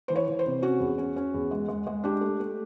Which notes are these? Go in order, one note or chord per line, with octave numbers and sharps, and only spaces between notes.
E3 C5
C#5
E3
C5
C3
C#4 F#4
E2
C#4
C#4
E2
G#3
G#3
G#3
D4 G4
A3
A3